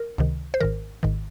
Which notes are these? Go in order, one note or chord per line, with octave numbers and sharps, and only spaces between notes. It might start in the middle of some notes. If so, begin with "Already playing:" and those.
Already playing: A#4
C#2 C3 D#3
C5
G#1 G#2 D#3 A#4
G#1 G#2 D#3